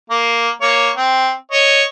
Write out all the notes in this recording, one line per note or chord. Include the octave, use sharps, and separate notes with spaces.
A#3
A#3 C#5
C4
C#5 D#5